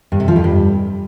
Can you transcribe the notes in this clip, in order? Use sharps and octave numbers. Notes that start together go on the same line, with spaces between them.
G2
C3
F3
F2
G2